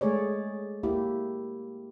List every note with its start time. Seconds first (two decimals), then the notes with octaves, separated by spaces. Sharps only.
0.01 G#3 A3 G#4 C#5 D5
0.83 A#3 E4 G4